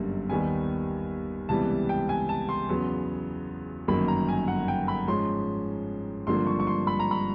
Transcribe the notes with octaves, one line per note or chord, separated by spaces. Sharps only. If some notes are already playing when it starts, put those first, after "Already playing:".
Already playing: G1 F#2 D3 G3 A#3
D#2 D#3 G3 B3 G#5
C#2 C3 E3 G3 B3 A5
G5
G#5
A5
C6
E2 C#3 F#3 B3
G1 F#2 D#3 F#3 A#3 B5
A#5
G#5
F#5
G5
B5
G#2 F3 G#3 C#4 C6
G#1 G2 D3 F3 A#3 C6
C#6
C#6
C6
B5
A#5
B5